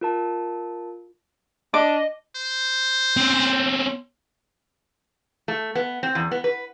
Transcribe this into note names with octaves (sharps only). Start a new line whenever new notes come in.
F4 A#4 A5
D4 D#5 D6
C5
C4 C#4
A3
B3
C4
E2
B3
B4